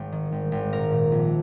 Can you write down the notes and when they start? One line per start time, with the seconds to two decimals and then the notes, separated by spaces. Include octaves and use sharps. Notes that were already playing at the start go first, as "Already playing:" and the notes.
Already playing: G#1
0.12 D#3
0.32 G#1
0.52 G#1
0.72 A#2 A#4
0.91 A#2
1.12 A#1